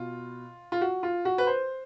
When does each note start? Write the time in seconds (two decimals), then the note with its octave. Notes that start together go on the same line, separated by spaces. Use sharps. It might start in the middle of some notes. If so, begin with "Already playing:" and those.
Already playing: B2 F4
0.72 F4
0.81 F#4
1.03 F4
1.25 F#4
1.38 B4
1.47 C5